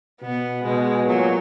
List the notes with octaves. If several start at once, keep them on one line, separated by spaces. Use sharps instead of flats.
B2 B3
B2 G#3
A#2 F#3